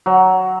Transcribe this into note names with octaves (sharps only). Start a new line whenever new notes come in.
F#3